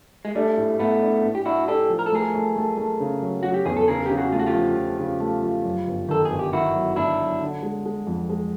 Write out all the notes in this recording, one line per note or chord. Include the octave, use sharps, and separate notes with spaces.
G#3
G3 A3 D4
A2
A2 A3 B3
D4
A2
G4
D4 E4 F#4
D4 G4 A4
F3
A#4
A4
A3 G#4 A#4
A3
A3
A3
C#3
F#3
F#3 F#4
G4
E2 G#4
A4
C#3 G#4 A#4
C#3 G4
F#4 G#4
A3 F4
F#4
F4 G4
F3
F3
C#3
A3
F3
F#2
G1
D#3 A4
G1 G#4
G4
D#3 E4 F#4
F#3
G1 D4 E4
F#3
D3
G#3
G#3
F2
G#3